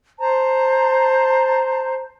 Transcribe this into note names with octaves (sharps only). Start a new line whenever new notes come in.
C5 A5 A#5